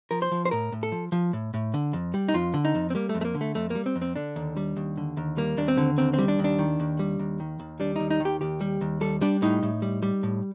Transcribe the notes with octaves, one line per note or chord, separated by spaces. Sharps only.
F3 A#4
C5
F3
C5
A2 A#4
A2
A4
F3
F3
A2
A2
D3
F2
G3
D#4
F2 F4
D3
D#4
F2
C4
G3 A#3
A3
F2
A3
A#3
D3
A3
F2 A3
G3 A#3
C4
F2
C4
D3 D4
D#2
G3
D#2
D3
D#2
G3 A#3
D#2 D4
C4
D3
D#2 C4
C4
G3
D4
D#2
D4
D#3
D#2
G3
D#2
D#3
D#2
G3 D4
D#2 D#4
D#4
D#3
G4
D#2 G4
G3
D#2
G3 A4
G3 D4
A2 D#4
A2
G3
G3
A2